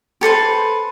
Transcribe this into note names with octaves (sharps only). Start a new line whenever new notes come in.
G4 A4 B4 C5